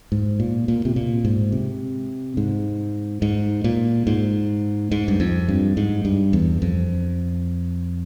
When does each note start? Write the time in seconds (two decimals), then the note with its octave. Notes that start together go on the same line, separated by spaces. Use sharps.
0.12 G#2
0.40 A#2
0.68 A#2
0.85 C3
0.96 A#2
1.25 G#2
1.52 C3
2.37 G#2
3.22 G#2
3.64 A#2
4.07 G#2
4.91 G#2
5.08 G2
5.20 F2
5.48 G2
5.77 G#2
6.05 G2
6.33 E2
6.62 F2